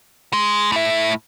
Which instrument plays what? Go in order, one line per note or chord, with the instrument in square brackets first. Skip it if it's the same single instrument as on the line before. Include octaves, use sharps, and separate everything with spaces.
[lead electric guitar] G#3
A2 E5